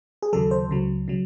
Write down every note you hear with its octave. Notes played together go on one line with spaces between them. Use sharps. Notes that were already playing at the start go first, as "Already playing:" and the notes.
G#4
D#2 C#3 F#3 A4
C5
C#2 C#3 F#3
C#3 F#3